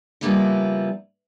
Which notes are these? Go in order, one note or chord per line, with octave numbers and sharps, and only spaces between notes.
C#3 F3 G3 A#3 B3 E4